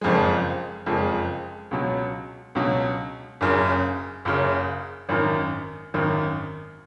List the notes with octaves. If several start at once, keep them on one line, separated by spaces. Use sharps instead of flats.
F#1 F2 F3 G#3
F#1 F2 F3 G#3
C#2 B2 F#3
C#2 B2 F#3
F#1 F#2 C#3
F#1 F#2 C#3
G#1 F#2 D#3
G#1 F#2 D#3